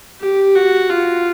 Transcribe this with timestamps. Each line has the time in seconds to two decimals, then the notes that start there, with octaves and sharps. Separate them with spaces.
0.21 G4
0.55 F#4
0.90 F4